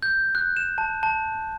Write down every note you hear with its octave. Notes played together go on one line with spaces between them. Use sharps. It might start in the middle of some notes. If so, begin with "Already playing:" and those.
G6
F#6
E7
A5
A5